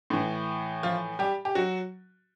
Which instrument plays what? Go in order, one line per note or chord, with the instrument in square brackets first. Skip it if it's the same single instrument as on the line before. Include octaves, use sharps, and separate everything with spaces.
[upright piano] A2 E3
F3 F4
G3 G4
G4
F#3 F#4